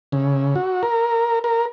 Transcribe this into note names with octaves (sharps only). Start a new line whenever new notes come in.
C#3
F#4
A#4
A#4